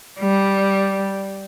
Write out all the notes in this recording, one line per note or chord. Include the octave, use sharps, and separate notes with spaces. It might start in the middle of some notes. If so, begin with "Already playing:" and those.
G3